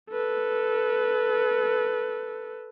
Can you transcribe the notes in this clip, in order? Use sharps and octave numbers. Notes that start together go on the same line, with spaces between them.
A4 B4